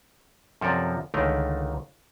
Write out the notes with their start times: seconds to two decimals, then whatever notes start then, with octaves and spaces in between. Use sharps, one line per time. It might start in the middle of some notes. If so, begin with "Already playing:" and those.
0.61 F#2 C3 F3 A4 A#4 D5
1.14 C#2 D3 D#3 A3 A#4 G5